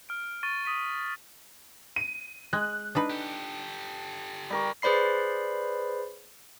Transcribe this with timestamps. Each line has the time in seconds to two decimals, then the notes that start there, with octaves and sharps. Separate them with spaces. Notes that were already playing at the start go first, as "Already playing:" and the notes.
0.09 F6 D7
0.43 C#6 A6 D#7 G7
0.65 D#6 B6 D#7
1.96 D#7
2.53 G#3 F#6
2.95 D4 D#4 B4
3.10 G4 A4
4.50 G3 A#4 C#6
4.82 G#4 B4 C5 D5 B5 C7